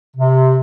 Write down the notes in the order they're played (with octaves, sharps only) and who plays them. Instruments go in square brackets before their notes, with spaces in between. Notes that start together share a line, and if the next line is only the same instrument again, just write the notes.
[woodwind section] C3